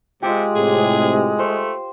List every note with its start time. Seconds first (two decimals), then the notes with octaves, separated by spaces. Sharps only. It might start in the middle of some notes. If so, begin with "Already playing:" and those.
0.22 C3 G#3 F4 G4
0.55 A2 C3 G#4
1.39 A3 C5